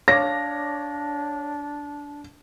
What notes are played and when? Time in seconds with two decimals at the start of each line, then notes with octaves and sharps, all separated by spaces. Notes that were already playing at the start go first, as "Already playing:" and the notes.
0.08 D4 C#5 F5 D6 A#6